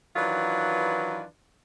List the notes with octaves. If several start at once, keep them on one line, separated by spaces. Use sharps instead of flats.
D#3 E3 F#3 D4 F4 B4